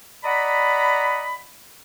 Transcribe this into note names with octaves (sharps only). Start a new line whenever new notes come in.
D5 D#5 F#5 A#5 B5